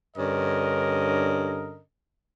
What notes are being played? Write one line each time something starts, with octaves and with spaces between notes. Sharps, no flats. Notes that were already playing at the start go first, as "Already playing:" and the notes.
G2 D3 C#4 A#4 D#5